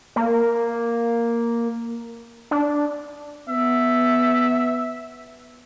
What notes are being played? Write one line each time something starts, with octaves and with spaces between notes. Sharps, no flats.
A#3
D4
B3 E5